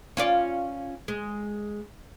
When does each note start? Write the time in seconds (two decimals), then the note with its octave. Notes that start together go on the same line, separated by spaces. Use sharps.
0.17 C#4 F4 D5
1.08 G#3